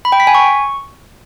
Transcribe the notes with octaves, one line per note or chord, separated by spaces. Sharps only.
B5
G5
B6
G#5
C#6